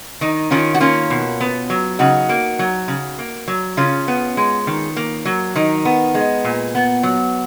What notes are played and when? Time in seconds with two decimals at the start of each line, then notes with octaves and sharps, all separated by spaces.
0.21 D#3 D#4
0.51 D#3 C#4 F4
0.74 F#4
0.80 A#3 C#4 F4
1.10 B2
1.40 B3
1.70 F#3
1.99 C#3 D#4 F#4
2.29 A#3
2.59 F#3
2.88 C#3
3.19 A#3
3.48 F#3
3.77 C#3 C#4 F4
4.08 B3
4.37 G#3
4.67 D#3
4.96 A#3
5.25 F#3
5.55 D#3 D#4
5.85 B3
6.15 G#3
6.44 A#2
6.75 B3
7.03 F#3